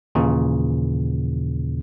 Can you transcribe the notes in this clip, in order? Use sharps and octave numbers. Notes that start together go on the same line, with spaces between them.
D#2 A#2 C#3 E3